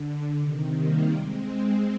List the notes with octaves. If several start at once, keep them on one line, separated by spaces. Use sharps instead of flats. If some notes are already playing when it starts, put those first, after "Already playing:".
Already playing: D3
C3 D#3
G3 A#3
G#3 C4